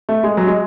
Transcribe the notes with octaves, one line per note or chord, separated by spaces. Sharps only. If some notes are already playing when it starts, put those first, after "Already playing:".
A3
G#3
F#3
G#3